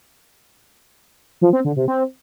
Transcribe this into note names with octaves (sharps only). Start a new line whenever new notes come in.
F3
C4
D3
C3
C4